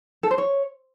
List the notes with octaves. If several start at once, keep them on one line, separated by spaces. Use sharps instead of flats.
A4
C5
C#5